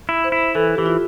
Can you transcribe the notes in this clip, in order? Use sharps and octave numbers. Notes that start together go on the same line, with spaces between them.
E4
C5
E4
E3 A4
E3 G4
F4